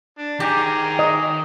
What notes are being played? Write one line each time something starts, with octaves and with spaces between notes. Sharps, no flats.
D4
D#3 G4 G#4 A#5
D#5